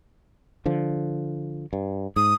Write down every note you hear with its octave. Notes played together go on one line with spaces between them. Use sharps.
D3 F3
G2
G#2 D#6